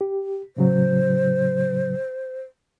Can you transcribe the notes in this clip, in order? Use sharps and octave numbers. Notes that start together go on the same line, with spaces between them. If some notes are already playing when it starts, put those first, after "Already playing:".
G4
A2 C#3 F#3 C5